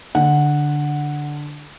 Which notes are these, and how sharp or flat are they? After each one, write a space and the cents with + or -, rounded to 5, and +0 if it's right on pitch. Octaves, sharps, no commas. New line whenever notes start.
D3 +0 F#5 -5